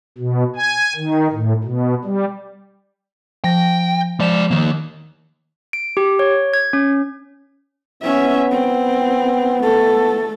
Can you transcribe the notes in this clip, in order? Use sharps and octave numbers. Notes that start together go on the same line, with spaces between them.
B2
G#5
D#3
A2
B2
G3
F3 G5 A#6
F3 G#3 D5 E7
D#3 A#3
D7
G4
C#5
G#6
C#4
B3 C#4 E5
C4
A3 A4